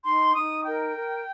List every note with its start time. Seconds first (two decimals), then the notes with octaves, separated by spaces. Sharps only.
0.05 D#4 C6
0.34 D#4 D#6
0.64 A#4 G5
0.94 A#4